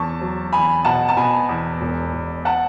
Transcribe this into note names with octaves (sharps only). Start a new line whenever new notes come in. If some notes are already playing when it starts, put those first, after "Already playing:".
Already playing: E2 A5 C#6
F#3
E2 G#5 B5
B2 F#5 A5
A5
B2 G#5 B5
E2
E1
E1
F#5 A5